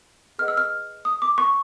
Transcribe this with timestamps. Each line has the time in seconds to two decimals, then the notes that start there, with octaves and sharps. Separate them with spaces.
0.38 G#4 B4 D#5 F#5 F6
0.48 E6
0.57 F6
1.05 D#6
1.22 D6
1.38 C#6